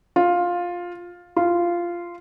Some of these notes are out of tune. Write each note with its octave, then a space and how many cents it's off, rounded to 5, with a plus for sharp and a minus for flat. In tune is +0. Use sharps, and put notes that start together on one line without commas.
F4 +10
F4 -10